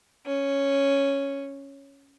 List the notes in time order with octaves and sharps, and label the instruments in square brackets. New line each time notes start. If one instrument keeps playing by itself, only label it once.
[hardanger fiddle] C#4